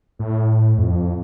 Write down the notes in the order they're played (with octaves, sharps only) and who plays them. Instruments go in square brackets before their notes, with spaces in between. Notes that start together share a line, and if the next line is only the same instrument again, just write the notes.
[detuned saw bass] A2
F2